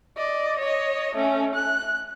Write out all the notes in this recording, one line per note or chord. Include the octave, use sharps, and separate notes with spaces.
D5 D#5
C#5 D#5
A3 C#4
F#6